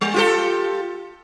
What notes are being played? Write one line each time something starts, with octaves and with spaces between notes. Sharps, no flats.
G3
F4 G4 A4